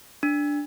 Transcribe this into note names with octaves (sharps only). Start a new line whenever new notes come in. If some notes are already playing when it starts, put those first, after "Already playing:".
D4